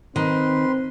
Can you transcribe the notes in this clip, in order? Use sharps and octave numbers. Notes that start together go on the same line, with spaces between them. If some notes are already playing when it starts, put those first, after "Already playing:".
D#3 C4 B4 C6